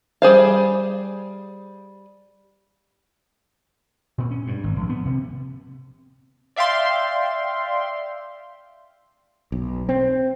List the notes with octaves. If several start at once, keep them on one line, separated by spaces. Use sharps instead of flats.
G3 G#4 C5 F5
A#2
C#4
G2
G#1
A#1
B3
C3
D5 E5 F5 G5 C6
B1
C4